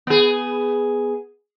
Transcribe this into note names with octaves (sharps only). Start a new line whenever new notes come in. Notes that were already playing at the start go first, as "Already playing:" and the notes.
B3 G#4